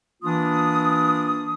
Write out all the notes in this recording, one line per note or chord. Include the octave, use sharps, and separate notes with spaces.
E3 A#3 D4 F4 D#6